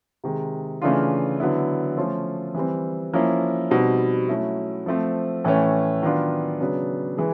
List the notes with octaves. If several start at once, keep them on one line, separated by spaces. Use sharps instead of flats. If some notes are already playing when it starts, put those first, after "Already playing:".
C3 D#3 G#3
C#3 E3 A3 D4 F4
D3 F#3 B3 E4
F3 A3 C#4 F4
E3 G3 C4
F3 A#3 C#4 E4
B2 G3 C4 D#4
F#3 A3 C#4 E4
F3 A3 C4
A2 E3 A3 C#4
D#3 F#3 B3 D4 F4
C#3 F#3 B3 D4
E3 G#3